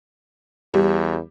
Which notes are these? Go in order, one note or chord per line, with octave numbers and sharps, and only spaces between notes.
E2 G3